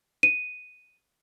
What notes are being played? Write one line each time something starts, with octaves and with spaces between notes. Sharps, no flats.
D#7